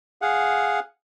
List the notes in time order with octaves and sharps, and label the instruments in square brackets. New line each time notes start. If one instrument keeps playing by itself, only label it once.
[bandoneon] G#4 F5 F#5